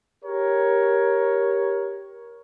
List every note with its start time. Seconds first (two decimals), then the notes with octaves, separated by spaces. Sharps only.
0.25 G4 A#4 C#5